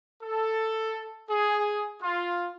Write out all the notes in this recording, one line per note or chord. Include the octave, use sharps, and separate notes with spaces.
A4
G#4
F4